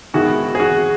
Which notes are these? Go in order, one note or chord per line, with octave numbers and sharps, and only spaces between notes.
G#2 D#3 G#3 B3 E4 F#4
G#4
F#4